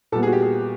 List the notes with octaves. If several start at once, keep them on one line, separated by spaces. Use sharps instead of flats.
A#2 G3 B3 A4
G#4
F#4
G4
G#4